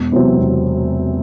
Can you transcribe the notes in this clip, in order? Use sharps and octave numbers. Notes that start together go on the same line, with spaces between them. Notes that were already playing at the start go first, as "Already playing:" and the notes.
Already playing: E1
E2 C3 F#3 C4
E1